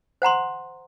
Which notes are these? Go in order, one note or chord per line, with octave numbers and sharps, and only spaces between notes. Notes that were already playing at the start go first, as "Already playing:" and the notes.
C5 F#5 A#5 C6